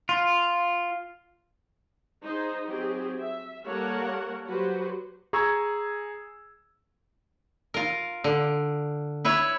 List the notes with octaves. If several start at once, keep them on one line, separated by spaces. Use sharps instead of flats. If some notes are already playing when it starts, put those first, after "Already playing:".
F4
D#4 G#4 C5
F#3 C4 G4 G#4
E5
G3 A#3 A4 A#4 C#5 F#5
F#3 F#4 G4 B4 C5
G#4 A#5 C#6 E6 G#6
F4 A#4
D3
E4 B4 C#5 E5